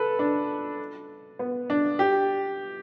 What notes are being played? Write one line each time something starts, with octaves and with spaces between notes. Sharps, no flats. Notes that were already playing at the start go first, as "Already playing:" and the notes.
Already playing: A4 B4
D4
B3
D4
G4